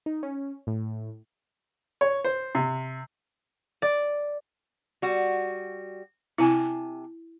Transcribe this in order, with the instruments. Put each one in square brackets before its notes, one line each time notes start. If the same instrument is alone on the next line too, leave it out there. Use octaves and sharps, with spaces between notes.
[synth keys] D#4
C#4
A2
[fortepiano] C#5
C5
C3
[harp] D5
[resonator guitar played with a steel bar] G3 F#4
[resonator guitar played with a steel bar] C3 G#5 A5 [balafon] E4